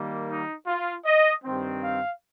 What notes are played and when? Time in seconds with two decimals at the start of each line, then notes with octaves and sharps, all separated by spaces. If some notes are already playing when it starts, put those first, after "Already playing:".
Already playing: D#3 G3 A#3
0.28 D#4
0.67 F4
1.05 D#5
1.45 G2 D#3 C4
1.83 F5